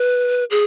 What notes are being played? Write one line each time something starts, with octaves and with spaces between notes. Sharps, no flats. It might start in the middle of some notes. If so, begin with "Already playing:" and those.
Already playing: B4
G#4